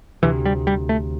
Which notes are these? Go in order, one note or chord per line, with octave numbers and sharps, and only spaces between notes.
D2 C3 E3
G3
G3
A3